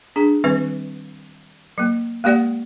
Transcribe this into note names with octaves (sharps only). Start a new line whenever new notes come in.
D4 G#4
D#3 G3 C4 B4
F#3 A#3
G#3 A#3 G4 D5 F#5